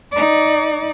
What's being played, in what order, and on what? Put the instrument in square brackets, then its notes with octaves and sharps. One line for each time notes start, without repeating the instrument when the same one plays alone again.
[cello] D#4 D5